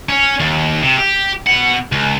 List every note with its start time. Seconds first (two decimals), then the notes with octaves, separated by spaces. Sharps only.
0.09 C#4
0.40 D#2
0.82 C3
0.99 G4
1.46 B2 F#5
1.92 C#2